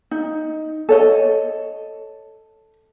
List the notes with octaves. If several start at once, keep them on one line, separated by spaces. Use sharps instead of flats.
D#4
A4 C#5 D#5